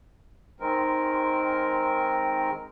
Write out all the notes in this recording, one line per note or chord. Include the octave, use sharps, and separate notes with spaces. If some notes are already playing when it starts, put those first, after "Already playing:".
D#3 G#3 C4 A#4